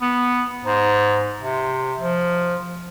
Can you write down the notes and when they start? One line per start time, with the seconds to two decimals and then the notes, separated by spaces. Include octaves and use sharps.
0.02 B3
0.65 G#2
1.42 C3
2.00 F3